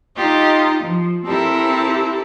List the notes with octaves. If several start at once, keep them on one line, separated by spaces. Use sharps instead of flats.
D#4 F4 G4 D#5
F3
C4 E4 G4 A4 A#4